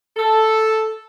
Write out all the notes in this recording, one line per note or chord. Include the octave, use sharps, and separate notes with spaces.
A4